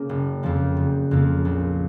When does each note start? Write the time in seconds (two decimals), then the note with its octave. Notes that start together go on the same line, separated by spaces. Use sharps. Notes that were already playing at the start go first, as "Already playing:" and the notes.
Already playing: C#3 A#3
0.09 F#1
0.43 F2 C#3 F3 A#3
0.77 F#1
1.11 F2 C#3 F3 A#3
1.45 A#1